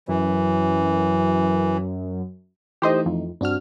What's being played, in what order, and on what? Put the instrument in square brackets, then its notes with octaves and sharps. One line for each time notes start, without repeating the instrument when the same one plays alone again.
[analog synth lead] F#2 [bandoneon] E3
[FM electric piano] E3 A3 D#4 [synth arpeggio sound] G4 C5 D#5
[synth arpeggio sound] F2
[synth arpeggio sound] G2 F6 [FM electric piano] C4 D4 F#4